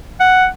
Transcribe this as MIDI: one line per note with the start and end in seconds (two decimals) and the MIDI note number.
0.20 0.47 78